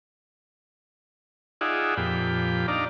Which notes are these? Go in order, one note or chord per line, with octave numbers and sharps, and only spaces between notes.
D#4 F4 G#4 D5 E5 F#5
F2 A#2 G4 B5
D4 D#4 D5 F5 A#5